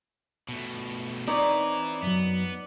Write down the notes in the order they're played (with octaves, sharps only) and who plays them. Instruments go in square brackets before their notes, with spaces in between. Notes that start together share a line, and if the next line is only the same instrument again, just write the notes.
[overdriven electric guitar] B2 A3
[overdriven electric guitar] E3 E4 [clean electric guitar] C4 [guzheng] D#4 C#5 [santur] D5
[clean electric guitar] F#2 F#3 [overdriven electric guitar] B3